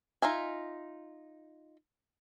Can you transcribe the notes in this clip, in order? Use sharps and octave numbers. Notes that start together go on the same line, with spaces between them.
D#4 F4 E5 G#5